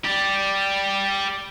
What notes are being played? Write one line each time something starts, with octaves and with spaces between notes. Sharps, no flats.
G4 D5